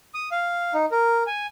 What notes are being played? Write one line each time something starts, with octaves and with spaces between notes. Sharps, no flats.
D#6
F5
D#4
A#4
G#5